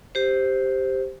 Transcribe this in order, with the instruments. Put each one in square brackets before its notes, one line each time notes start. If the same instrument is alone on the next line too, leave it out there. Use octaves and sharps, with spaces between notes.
[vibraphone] G4 C5